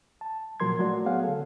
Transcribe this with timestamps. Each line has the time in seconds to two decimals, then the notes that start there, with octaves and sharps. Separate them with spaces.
0.21 A5
0.60 A#2 F3 F#3 A#4 C6 G#6
0.79 F#3 A3 F#4 D5
1.06 B3 G#4 C#5 F5 F#5
1.24 D3 A4